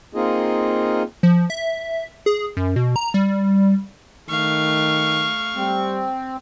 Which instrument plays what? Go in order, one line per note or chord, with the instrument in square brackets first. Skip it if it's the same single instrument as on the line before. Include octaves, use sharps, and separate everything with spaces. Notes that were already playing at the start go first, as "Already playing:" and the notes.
[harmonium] A#3 C4 D#4 F4 G#4 D#5
[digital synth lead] F3
E5
G#4
F#2
B2
A#5
G3
[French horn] D#3 [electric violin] A3 F5 [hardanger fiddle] C#6
[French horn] G3 [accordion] C4